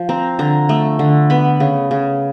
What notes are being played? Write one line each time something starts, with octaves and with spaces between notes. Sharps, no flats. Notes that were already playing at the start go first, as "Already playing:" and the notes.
Already playing: F3
C4 A#5
D3 A#5
A3
D3
B3 B5
C#3
C#3